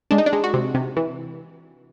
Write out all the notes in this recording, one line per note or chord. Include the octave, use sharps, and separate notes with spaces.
G#3 D4
D#4
D4
G#3
F#4
C3
C3
E3